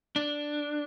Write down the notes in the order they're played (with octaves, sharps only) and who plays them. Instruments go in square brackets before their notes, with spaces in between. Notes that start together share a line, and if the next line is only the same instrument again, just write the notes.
[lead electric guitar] D4